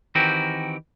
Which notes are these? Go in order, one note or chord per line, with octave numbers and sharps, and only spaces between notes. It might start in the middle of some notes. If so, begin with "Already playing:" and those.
D#3 E3 C4 F#4 G4 A#4